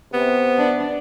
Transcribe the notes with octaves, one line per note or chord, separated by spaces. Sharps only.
C3 B3
D4